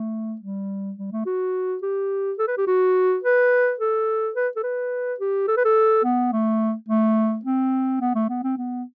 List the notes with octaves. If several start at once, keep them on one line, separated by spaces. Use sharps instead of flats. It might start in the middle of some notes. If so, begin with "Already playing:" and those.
Already playing: A3
G3
G3
A3
F#4
G4
A4
B4
G4
F#4
B4
A4
B4
A4
B4
G4
A4
B4
A4
B3
A3
A3
C4
B3
A3
B3
C4
B3